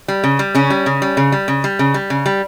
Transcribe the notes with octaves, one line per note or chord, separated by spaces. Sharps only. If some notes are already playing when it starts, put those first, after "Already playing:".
G3
C#3
G3
C#3 C#4
G3
C#3
G3
C#3
G3
C#3
G3
C#3
G3
C#3
G3